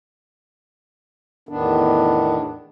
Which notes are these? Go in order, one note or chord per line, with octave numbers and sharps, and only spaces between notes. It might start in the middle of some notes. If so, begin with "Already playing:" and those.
E2 A2 D#3 B3 D4